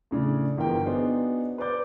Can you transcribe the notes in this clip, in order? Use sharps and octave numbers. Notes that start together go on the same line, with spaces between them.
A2 C#3 D4
G1 E3 F3 A#4 G5
B3 D4 D#4 F#4 G#4 C5
B4 C5 D5 D6 G6